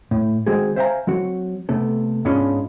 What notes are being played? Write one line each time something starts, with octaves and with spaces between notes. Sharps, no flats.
A2
D#3 G#3 C4 F#4 G#4
C5 E5 F5 G5 G#5 A#5
F#3 C4 F#4
C3 A3 B3 A4
G#2 G#3 B3 C#4 D4 F4